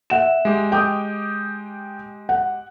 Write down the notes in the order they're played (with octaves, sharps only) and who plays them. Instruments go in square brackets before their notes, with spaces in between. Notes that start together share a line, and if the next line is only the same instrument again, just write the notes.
[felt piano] E5 F#5 E7
[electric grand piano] G#3 G4
[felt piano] G5 D6 D#6
F#5